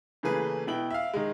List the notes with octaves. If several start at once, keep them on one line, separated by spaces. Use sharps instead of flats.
C#3 E3 A3 A#3 G#4 B4
B2 E4 G5 F#7
E5 F5
D#3 G#3